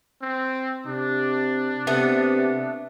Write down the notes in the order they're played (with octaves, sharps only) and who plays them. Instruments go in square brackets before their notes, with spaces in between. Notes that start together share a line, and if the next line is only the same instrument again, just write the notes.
[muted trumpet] C4
[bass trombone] C3 [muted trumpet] D4
[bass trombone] C3 [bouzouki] A3 B3